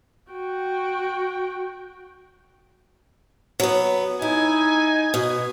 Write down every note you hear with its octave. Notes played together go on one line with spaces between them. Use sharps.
F#4 G5
F#3 B3
D#4 E4 G#5
B2